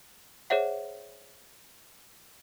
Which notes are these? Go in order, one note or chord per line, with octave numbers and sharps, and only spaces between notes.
G#4 C5 C#5 E5 F#5